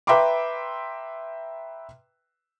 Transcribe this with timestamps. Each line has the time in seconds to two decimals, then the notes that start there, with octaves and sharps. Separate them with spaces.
0.07 B4 E5 G5 A#5 C6 D6